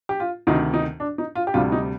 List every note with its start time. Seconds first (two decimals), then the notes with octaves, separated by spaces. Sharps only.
0.09 G4
0.20 F4
0.47 D2 C3 D#3 D#4
0.74 D#4
1.00 D4
1.18 D#4
1.35 F4
1.47 G4
1.54 D2 C3 G3 F4
1.72 D#4